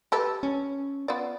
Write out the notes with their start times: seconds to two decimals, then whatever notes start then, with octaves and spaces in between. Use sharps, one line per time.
0.12 G4 A4 B4
0.43 C#4
1.08 B3 F4 D5